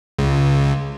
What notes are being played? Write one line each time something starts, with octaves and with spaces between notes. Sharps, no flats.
C#2